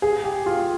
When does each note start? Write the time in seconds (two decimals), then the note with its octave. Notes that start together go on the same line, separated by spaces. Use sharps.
0.02 G#4
0.24 G4
0.46 F4